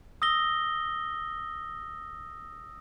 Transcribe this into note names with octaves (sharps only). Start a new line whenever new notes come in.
D#6 E6 A#6 G7